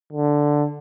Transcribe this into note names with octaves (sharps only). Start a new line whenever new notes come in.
D3